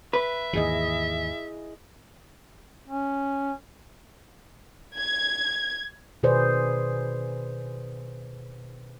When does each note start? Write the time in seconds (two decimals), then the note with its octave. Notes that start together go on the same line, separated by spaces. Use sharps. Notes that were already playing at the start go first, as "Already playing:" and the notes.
0.13 B4 E5
0.53 D#2 G#2 E3 E4 G#4 D#5
2.88 C#4
4.97 G#6
6.23 B2 D#3 G#4 B4 C5 D5